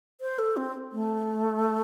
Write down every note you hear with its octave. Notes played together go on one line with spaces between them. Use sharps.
C5
A4
C4
A3